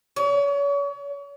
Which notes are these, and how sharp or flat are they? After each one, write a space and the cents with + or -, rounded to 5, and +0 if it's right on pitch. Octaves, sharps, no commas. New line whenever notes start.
C#5 +40